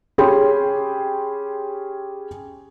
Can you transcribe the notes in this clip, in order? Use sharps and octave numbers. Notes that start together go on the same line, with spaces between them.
C#4 G4 G#4 G5 B5 C6